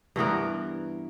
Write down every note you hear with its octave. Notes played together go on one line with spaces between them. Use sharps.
G2 E3 B3 A#4